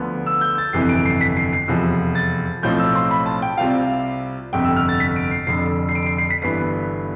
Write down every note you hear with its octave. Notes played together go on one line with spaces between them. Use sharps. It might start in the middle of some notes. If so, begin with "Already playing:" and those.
Already playing: D2 D3 F3 B3
E6
G6
A6
G1 F2 C3 E3 C7
D7
C7
B6
C7
C7
F1 E2 C3 F3
A6
B1 A2 F3 C4 F4 G6
E6
C6
B5
A5
G5
C2 C3 G3 C4 F4 F5
G1 F2 C3 G5
E6
F6
A6
B6
D7
C7
F1 F2 D3 C7
C7
D7
C7
C7
B6
G1 G2 E3 B3 C7